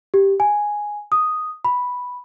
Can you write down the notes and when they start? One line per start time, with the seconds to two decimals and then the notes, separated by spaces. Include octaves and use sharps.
0.14 G4
0.40 G#5
1.12 D#6
1.65 B5